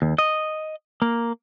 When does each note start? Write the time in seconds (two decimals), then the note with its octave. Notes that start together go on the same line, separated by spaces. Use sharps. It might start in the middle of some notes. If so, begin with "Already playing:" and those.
0.02 D#2
0.18 D#5
1.02 A#3